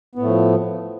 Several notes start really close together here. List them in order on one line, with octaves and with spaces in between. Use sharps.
B3 A2 A3 F3